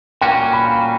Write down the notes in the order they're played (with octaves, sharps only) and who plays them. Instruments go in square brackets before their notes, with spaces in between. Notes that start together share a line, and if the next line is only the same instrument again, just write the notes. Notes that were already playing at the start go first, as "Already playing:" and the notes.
[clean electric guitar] A#2 G3 A#3 C#4 F#4 [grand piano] G5
[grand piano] B5